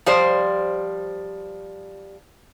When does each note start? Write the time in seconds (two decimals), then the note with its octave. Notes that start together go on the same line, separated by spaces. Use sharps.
0.06 F3 G3 C5